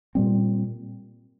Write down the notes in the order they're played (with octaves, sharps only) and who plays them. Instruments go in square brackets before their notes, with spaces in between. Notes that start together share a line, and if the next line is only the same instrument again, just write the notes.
[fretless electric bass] A#2 G3 C4